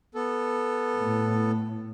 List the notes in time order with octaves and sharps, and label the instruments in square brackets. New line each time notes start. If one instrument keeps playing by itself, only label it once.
[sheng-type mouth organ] B3 A4
[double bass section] A2